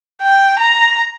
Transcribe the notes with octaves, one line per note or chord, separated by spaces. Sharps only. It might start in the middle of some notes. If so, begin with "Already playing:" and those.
G5
A#5